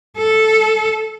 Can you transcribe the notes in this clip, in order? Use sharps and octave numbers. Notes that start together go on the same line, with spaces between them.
A4